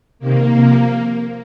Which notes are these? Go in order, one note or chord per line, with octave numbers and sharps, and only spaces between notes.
C3 D#3 A#3
C3 F3